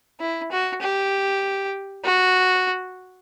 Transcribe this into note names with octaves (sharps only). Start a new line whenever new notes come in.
E4
F#4
G4
F#4